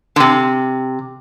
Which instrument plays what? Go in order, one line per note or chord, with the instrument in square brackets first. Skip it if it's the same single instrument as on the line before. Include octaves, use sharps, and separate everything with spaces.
[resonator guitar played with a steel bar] D3
C3